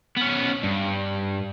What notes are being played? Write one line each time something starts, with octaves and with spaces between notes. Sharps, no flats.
B3 C#4
G2